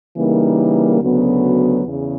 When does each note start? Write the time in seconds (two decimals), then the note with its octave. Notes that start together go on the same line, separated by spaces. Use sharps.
0.17 C#3 E3 G3 A#3 D#4
1.01 D2 C#3 F#3 B3
1.86 E2 C#3